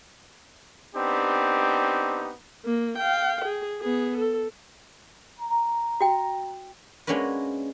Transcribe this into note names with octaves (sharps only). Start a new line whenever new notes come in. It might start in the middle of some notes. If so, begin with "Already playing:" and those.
B3 C4 D4 D#4 G4
A#3
F5 G5
G#4
B3 G#4
A4
A#5
F#4 G5
G#3 A#3 C#4 D4 F#4 B4